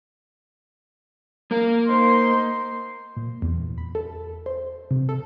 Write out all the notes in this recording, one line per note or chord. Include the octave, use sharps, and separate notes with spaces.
A#3 A#4
D#4 C5 C6
A#2
E2
B5
A4
C5
C3
A4